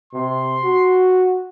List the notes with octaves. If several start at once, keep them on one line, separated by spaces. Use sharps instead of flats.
C3 C6
F#4